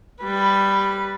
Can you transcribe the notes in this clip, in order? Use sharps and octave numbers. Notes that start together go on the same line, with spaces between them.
G3 B4